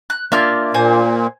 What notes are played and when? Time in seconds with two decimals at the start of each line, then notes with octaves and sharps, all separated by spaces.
0.10 F#6
0.32 A#3 D4 F4 E5 F6
0.74 A#2 C5 G#5